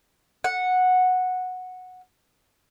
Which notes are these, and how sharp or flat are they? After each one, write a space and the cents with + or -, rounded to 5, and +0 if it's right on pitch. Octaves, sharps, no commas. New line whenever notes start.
F#5 -10